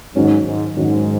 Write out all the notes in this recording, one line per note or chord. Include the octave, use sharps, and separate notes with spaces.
G#2 D#3 F#3 C#4
G#2
G#2 D#3 F#3 C#4